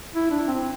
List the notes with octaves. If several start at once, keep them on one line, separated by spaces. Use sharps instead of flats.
E4
D4
C4